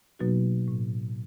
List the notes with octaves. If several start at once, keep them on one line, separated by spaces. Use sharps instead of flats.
B2 F#3 A#3 B3 D#4 F#4
A2